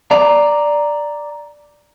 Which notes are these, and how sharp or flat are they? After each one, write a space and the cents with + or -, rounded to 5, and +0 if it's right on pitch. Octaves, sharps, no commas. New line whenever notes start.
D5 +0 A#5 +0